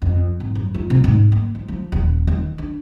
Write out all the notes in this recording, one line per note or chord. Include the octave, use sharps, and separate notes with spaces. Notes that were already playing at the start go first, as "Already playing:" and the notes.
F2
G#1
F#2
F4
C3
G#2
A#3
F3
F3
D#1
D#3
D4